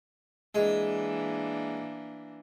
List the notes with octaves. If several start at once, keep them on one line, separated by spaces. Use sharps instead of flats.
E3 G#3 A#3 D4